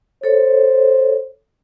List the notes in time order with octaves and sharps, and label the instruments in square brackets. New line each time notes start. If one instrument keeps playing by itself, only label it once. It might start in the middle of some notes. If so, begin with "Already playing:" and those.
[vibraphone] A4 C#5 [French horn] C5